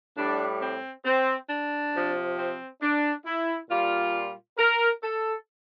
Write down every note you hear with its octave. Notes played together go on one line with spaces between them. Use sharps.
A2 G3 D4
C4
C4
D4
C3 F3
C4
D4
E4
A#2 G3 F4
A#4
A4